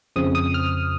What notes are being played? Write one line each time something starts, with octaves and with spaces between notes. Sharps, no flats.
F2 C#3 F3 C4 D#6
D#6
F6